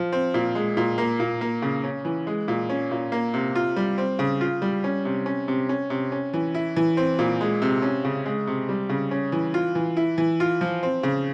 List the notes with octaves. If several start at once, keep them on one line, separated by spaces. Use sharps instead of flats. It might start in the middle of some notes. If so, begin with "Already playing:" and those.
Already playing: F3
C4
A#2
G#3
A#2
A#3
A#2
A#3
C#3
C#4
E3
G#3
A#2
C#4
A#2
A#3
C3
F4
G3
C4
C#3
F4
G3
C#4
C3
C#4
C3
C#4
C3
C#4
E3
E4
E3
C4
A#2
G#3
C3
C#4
C#3
G#3
C3
G3
C#3
C#4
E3
F4
E3
E4
E3
F4
F3
C4
C#3